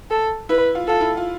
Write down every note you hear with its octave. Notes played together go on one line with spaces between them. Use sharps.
A4
E4 B4
F4
F4 A4
E4
F4